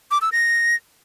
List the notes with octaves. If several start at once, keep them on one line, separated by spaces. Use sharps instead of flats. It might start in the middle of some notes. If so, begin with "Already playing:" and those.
D6
E6
A#6